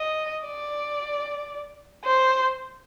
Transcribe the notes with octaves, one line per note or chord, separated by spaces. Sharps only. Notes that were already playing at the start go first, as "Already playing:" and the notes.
Already playing: D#5
D5
C5